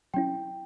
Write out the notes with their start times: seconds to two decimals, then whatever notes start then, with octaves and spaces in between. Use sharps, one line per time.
0.14 F#3 C#4 E4 G5